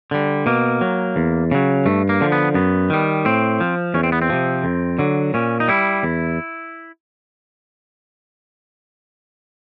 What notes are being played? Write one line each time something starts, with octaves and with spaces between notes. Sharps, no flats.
D3 G3
B2 A#3
F#3
E2
C#3 F#3
G2 A3
A#3
D3 F3
B3
F#2 B3
D#3 G3
A2 C4
F3
E2 C#4
C4
B3
C4
C3 F3
F2
D3 F#3
A#2 C#4
D#4
G3 E4
E2